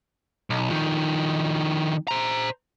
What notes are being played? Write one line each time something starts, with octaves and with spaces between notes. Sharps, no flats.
B1
F2 D#3
C5 A#5